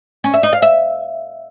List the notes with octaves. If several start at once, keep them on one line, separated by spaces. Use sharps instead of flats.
C#4
E5
D#4
F5
E5